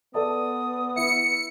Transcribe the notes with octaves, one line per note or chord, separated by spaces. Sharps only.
B3 A4 D5 A5 D#6
E4 E5 C#7